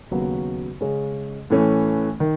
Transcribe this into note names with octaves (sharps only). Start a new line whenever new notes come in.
D#2 C#3 F#3 B3 F#4
C#3 G#3 C#4
A2 E3 A3 C#4
D#3